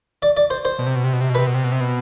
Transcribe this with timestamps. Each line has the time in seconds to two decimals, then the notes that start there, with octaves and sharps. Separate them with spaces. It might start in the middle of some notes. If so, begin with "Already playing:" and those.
0.22 D5
0.37 D5
0.50 C5
0.65 C5
0.79 B2
0.87 C3
0.96 B2
1.04 C3
1.13 B2
1.21 C3
1.29 B2
1.35 B4
1.38 C3
1.47 B2
1.54 C3
1.64 B2
1.72 C3
1.81 B2